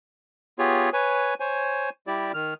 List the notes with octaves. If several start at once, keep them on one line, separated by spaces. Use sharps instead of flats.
B3 F4 G4 G#4 C#5
B4 C#5 G#5
C5 C#5 G#5
G3 E4 G4 D5
D#3 F6